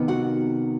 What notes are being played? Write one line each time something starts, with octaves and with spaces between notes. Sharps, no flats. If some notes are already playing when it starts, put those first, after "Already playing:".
Already playing: C3 D#3 B3
F#4 F#5